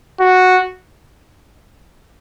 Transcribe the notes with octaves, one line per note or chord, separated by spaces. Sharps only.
F#4